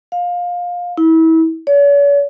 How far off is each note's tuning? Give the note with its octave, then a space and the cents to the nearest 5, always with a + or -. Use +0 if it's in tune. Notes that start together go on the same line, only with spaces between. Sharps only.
F5 +20
E4 -30
C#5 +45